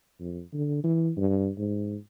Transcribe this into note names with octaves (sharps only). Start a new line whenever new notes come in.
F2
D3
E3
G2
G#2